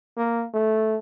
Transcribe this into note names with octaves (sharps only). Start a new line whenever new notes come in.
A#3
A3